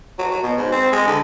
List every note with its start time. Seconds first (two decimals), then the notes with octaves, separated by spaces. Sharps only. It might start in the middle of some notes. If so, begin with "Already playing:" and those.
0.19 F#3
0.31 F#3
0.43 B2
0.58 G#2
0.72 C4
0.92 G#3
1.07 D3